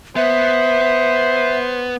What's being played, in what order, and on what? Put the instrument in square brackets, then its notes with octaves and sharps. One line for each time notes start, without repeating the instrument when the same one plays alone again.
[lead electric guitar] B3 [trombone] C5 [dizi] E5